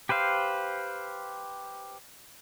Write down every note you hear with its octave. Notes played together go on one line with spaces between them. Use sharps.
G4 B4 C5 F5